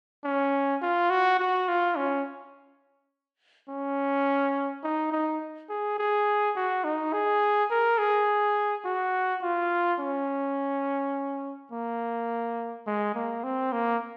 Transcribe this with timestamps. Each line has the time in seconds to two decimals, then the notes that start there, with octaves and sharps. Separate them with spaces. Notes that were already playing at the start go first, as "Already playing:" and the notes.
0.24 C#4
0.82 F4
1.10 F#4
1.39 F#4
1.69 F4
1.97 C#4
3.69 C#4
4.83 D#4
5.12 D#4
5.69 G#4
5.98 G#4
6.56 F#4
6.84 D#4
7.13 G#4
7.70 A#4
7.98 G#4
8.85 F#4
9.42 F4
9.99 C#4
11.72 A#3
12.87 G#3
13.15 A#3
13.44 C4
13.72 A#3